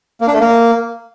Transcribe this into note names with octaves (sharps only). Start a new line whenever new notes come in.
A#3
D4
A3
A#3